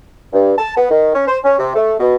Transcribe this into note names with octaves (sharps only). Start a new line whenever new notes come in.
G2
A5
B3
D#3
C#4
C5
C#4
C3
A3
B2